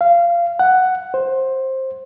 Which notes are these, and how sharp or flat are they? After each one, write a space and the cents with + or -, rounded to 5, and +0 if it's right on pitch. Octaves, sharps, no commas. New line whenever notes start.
F5 -20
F#5 +5
C5 +15